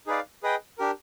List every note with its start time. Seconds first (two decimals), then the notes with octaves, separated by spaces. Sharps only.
0.07 D#4 G#4 B4 D5 F5
0.43 G#4 B4 D#5 G5
0.78 D4 G4 A#4